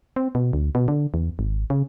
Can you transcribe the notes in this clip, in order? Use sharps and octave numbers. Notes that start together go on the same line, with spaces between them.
C4
B2
D2
B2
D3
E2
G#1
C#3